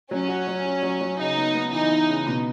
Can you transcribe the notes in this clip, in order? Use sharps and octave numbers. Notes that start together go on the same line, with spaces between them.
F#3 C#4
F#4
F#3
F#4
F#3
F#3
C#3 D#4
B3
B3
E3 D#4
E3
C#3
B2